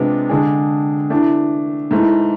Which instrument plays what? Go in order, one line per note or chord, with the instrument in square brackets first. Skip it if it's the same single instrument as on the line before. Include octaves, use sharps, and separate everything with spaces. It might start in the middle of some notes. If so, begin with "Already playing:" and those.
Already playing: [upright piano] C3 G#3 B3 D4 F4
D3 G#3 D4 G#4
E3 A3 D4
G#2 E3 A3